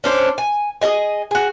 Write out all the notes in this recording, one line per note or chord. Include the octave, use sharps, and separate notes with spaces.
C#4 D4 C5
G#5
G#4 A4 D#5 G#5
F#4 G#4